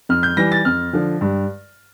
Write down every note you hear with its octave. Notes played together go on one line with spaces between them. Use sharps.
F2 F6
G6
E3 G3 A#6
A6
F2 F6
D3 F3
G2